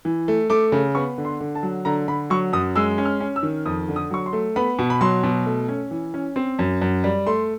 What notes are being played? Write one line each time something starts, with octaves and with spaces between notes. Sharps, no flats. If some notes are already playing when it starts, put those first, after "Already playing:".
E3
A3
A3 D6
C#3
B3 C#6
D3
C6
D3
A5
F#3
D3 A#5
D3 B5
F#3 C#6
F#2 D#6
G#3 E6
C#4
F6
C#4
E6
D#3
F2 D#6
D3
D#6
F#3 C#6
C6
A3
B3 B5
B2
B5
F#3 C6
B2
A3
C#4
E3
C#4
C4
F#2
F#2
G3
A3 C6